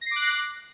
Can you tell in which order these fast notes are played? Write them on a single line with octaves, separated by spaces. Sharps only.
A#6 C7 D6 F#6